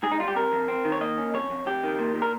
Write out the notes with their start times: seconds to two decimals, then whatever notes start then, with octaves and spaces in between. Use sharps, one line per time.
0.03 G#2 G#4
0.12 D#4
0.19 G3 F4
0.28 G4
0.36 C3 A#4
0.52 F2
0.68 C4
0.85 D#3
0.92 C#5
1.01 A#3 D#5
1.18 C#4
1.34 F2 C#5
1.50 F2
1.66 F2 G4
1.84 D#3
1.99 A#2
2.15 A#2
2.22 A#4